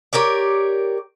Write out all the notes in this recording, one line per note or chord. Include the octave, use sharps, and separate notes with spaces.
G4 A#4 C#5 D5